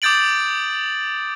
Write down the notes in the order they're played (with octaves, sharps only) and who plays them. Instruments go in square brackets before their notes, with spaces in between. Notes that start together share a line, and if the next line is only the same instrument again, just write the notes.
[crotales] D6 D#6 G6 A6 D7 F#7